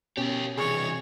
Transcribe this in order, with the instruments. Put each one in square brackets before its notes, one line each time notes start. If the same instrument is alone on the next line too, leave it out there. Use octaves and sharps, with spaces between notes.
[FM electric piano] B2 C#4 [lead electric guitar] G4 A#4
[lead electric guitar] C3 E3 [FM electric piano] G#4 [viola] C#5